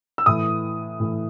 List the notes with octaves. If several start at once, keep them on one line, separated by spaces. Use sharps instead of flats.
E6
A2 E3 D#6
A2 E3